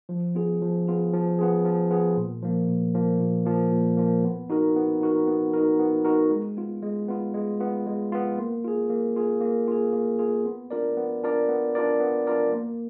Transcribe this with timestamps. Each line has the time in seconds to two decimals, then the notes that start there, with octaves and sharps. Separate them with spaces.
0.09 F3
0.35 B3 F4 G#4
0.61 F3
0.87 B3 F4 G#4
1.13 F3
1.39 B3 F4 G#4
1.65 F3
1.91 B3 F4 G#4
2.17 A#2
2.42 F3 A#3
2.68 A#2
2.94 F3 A#3
3.20 A#2
3.46 F3 A#3
3.72 A#2
3.97 F3 A#3
4.24 B3
4.50 D#4 F#4 A#4
4.76 B3
5.01 D#4 F#4 A#4
5.27 B3
5.54 D#4 F#4 A#4
5.79 B3
6.05 D#4 F#4 A#4
6.31 G#3
6.57 B3 F4
6.83 G#3
7.08 B3 F4
7.34 G#3
7.60 B3 F4
7.86 G#3
8.12 B3 F4
8.38 A#3
8.64 F4 G#4
8.90 A#3
9.16 F4 G#4
9.41 A#3
9.68 F4 G#4
9.93 A#3
10.19 F4 G#4
10.45 B3
10.71 D4 F4 A#4 D5
10.97 B3
11.23 D4 F4 A#4 D5
11.49 B3
11.75 D4 F4 A#4 D5
12.00 B3
12.27 D4 F4 A#4 D5
12.52 A#3